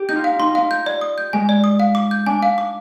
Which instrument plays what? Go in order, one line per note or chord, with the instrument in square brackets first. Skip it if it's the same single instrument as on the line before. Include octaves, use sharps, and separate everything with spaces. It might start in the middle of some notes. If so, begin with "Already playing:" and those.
Already playing: [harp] G4
[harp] D#4 [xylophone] G6
[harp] F4
[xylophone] F5
[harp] D#4 [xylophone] C6
[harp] F4
[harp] D#4 [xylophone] F5
[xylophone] G6
D5
D#6
G6
[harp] G#3 [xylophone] G#5
[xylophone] D5
D#6
F5
D6
G6
[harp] D4 [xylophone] G#5
[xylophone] F5
D6